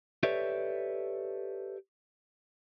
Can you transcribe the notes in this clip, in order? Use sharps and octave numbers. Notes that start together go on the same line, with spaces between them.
G4 A4 B4 C#5 D5 E5